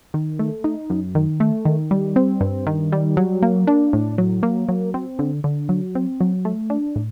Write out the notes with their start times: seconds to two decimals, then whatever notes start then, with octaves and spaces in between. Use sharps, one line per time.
0.14 D#3
0.39 A3
0.64 D#4
0.90 F#2
1.15 D#3
1.40 A3
1.65 D#3
1.91 G3
2.16 C4
2.41 G2
2.67 D#3
2.92 G3
3.17 F#3
3.42 A#3
3.67 D4
3.93 A2
4.18 F#3
4.43 A#3
4.69 F#3
4.94 C4
5.19 D3
5.44 D3
5.69 F#3
5.95 C4
6.21 F#3
6.45 A3
6.70 D4
6.96 A2